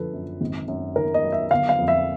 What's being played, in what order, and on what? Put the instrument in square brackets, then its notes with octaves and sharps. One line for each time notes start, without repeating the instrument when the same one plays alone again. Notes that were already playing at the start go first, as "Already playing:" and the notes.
Already playing: [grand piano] F#2 D3 F3 A4 B4
F#2
G#1
F#2
D#3 A#4
D#5
F#3
E5
G1 F5
F5
F2
E5